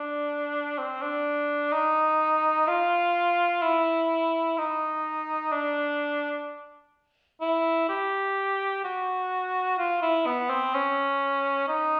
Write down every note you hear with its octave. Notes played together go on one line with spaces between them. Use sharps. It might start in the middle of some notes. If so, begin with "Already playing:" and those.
Already playing: D4
C4
D4
D#4
F4
E4
D#4
D4
E4
G4
F#4
F4
E4
B3
C4
C#4
D#4